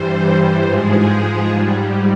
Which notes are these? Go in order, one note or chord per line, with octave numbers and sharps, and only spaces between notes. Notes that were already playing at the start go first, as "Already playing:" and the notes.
Already playing: G2 E3 G3 C5
G#2 F3 G#3 G#4
G#2 G3